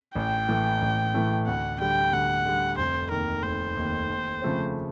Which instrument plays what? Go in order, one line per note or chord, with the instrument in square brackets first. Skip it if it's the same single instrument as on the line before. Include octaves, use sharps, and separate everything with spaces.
[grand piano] A1 [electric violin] G5
[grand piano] A2 E3 A3
A1
A2 E3 A3
[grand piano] D2 [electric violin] F#5
[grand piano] D3 G3 [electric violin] G5
[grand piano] D2 [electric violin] F#5
[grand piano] D3 G3
[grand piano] F1 [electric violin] C5
[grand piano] D#2 D#3 [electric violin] A#4
[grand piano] F1 [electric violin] C5
[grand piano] D#2 D#3
D#2
C#3 F3 A3 C4